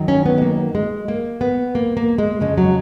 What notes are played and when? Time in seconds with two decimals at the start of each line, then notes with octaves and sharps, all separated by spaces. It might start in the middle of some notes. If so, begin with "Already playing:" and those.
Already playing: F#2 D#3 F#3
0.08 C#4
0.26 B3
0.38 G#3
0.42 A#3
0.75 G#3
1.08 A#3
1.41 B3
1.75 A#3
1.97 A#3
2.18 G#3
2.40 F2 C#3 F3 G#3
2.57 F#3